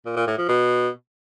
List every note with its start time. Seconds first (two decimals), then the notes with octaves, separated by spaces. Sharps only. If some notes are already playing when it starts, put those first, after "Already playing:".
0.06 A#2
0.16 A#2
0.27 A2
0.38 F3
0.49 B2